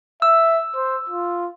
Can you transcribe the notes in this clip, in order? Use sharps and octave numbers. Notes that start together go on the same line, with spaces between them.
E5 E6
C5
F4